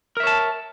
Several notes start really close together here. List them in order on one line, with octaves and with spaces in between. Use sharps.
A#4 E5 C#5 A5